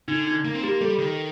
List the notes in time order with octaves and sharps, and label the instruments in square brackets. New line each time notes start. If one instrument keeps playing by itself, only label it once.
[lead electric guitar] D3 [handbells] D#4
[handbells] D#4
[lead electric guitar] A#3
C4
[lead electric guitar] A#3 [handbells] G4
[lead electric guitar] G3 [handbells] A4
[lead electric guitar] D#3